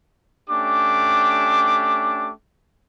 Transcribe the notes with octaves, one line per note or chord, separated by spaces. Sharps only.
A3 C#4 D4 G4 D6